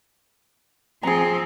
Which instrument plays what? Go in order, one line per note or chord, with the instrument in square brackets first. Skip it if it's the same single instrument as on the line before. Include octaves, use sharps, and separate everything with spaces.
[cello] F3 C4 [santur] G#4 A#5